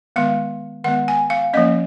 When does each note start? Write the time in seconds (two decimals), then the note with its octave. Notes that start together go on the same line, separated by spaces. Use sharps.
0.16 D#3 G#3 B3 F5
0.84 D#3 G#3 B3 F#5
1.08 G#5
1.30 F5
1.53 F3 A#3 C#4 D#5